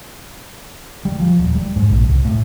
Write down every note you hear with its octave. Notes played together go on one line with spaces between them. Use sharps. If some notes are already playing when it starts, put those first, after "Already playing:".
G3
F3
D#1
G3
G#2
A#1
C2
A2